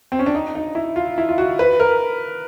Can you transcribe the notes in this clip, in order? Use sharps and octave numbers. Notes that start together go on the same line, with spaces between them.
C4
C#4
D4
D#4
D#4
E4
F4
E4
F4
F#4
B4
A#4